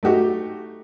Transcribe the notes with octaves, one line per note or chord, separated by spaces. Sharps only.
A3 D#4 F#4 G4